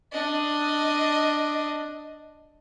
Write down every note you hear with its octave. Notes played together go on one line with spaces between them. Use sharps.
D4 D#5